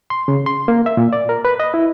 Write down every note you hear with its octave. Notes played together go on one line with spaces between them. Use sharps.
C6
C#3
C6
A#3
E5
A#2
D5
A#4
B4
D#5
E4